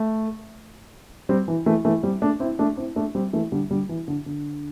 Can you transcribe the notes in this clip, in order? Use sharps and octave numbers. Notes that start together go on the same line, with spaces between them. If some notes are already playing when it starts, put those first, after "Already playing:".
Already playing: A3
G3 C4
E3
E3 A3
E3 A3
G3 C4
A3 D4
C4 E4
A3 D4
C4 E4
A3 D4
G3 C4
E3 A3
D3 G3
D3 G3
E3
D3
D3